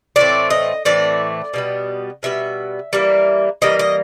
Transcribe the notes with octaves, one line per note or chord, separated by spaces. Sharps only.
A2 E3 A3 C4 D5
D#5
A2 E3 A3 C4 D5
B2 G3 B3
B2 G3 B3 E5
E3 G3 A#3
E3 G3 A#3 D#5
D#5